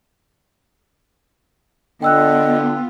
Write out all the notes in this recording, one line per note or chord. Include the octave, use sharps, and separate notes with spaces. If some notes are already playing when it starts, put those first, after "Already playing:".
D3 B3 F4 D#5 G5 E6 F#6